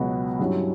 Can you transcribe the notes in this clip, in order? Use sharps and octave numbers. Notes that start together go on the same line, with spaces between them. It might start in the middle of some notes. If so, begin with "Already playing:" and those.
Already playing: C#2 B2 F#3 B3 F#4
G2 F#3 C#4 E4 G4